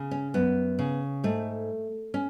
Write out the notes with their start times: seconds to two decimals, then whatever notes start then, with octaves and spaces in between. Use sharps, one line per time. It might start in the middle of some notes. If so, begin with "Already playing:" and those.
Already playing: C#3
0.11 C#4
0.34 F#2 B3
0.79 C#3
1.24 G#2 A3
2.14 C#4